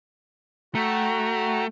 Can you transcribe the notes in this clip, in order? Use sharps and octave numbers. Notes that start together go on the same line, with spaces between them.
A3 F#4 G5 A#5